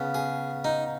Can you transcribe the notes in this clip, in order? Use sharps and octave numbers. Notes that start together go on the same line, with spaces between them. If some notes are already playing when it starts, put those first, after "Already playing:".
Already playing: C#3 B3
G#4
D#4